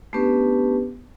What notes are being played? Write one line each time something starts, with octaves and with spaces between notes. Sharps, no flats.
A3 B3 C#4 D4 G4 B4